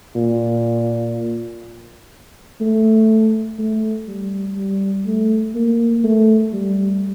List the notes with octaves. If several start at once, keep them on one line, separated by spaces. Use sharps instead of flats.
A#2
A3
A3
G3
G3
A3
A#3
A3
G3